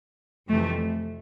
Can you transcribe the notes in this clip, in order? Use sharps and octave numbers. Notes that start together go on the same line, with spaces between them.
F2 C3 E3 A3